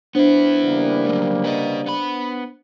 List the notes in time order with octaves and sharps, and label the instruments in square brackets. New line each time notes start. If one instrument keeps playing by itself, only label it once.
[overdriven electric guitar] B3 E4 [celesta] D4 C5
[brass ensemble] C#3 G3 A#3
[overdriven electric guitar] F#3 A3
B4 D#5
B3 B5